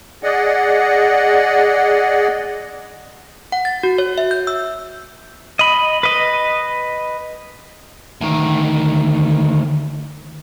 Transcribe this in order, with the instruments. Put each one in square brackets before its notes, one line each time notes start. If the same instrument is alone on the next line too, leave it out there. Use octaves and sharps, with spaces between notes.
[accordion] G#4 D5 D#5 F#5
[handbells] F#5
A6
F#4
C#5
E5
G6
E6
[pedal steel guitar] D#5 B5
B4 D#5
[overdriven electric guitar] D2 D#3